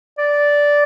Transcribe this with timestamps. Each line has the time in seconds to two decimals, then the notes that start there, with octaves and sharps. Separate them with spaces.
0.18 D5